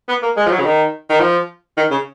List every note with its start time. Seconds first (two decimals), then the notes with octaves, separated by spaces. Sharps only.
0.08 B3
0.23 A#3
0.37 G#3
0.46 F3
0.51 F#3
0.59 C#3
0.65 D#3
1.10 D#3
1.20 F3
1.77 D#3
1.91 C#3